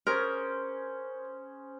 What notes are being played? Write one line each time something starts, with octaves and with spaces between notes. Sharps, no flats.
C#4 G#4 A#4 C5